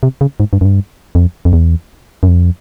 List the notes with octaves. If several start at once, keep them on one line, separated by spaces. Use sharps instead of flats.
C3
C#3
G#2
G2
F#2
G2
F2
F2
E2
F#2
F2